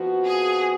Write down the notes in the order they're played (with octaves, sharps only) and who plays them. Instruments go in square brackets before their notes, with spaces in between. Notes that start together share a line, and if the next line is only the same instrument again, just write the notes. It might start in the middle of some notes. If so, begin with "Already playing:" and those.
Already playing: [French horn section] F2 F3 B3 F#4
[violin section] G#4